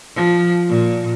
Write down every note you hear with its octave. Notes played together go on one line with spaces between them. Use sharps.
F3
A#2